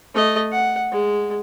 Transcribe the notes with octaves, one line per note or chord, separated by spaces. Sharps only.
A3 D#5
F#5
G#3